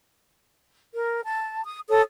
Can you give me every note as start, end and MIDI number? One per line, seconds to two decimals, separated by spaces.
0.94 1.21 70
1.24 1.61 81
1.65 1.80 87
1.89 2.01 69
1.89 2.01 73
1.89 2.01 87